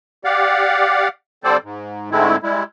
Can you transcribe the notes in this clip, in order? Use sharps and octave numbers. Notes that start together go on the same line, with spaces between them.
G4 D5 F5 F#5
D3 G3 C4 A4 C5 D5
G#2
G#2 D3 G#3 A3 C4 E4
G3 G#3 E4